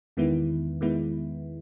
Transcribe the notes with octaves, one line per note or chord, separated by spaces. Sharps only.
E2 D#3 G#3 B3 E4
D#3 G#3 B3 E4